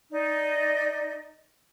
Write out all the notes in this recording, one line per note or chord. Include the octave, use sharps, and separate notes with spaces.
D#4 D5 D#5